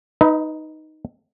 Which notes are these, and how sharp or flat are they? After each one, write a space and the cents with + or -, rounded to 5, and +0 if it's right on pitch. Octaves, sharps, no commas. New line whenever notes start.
D#4 +0 B4 +0 D#5 +40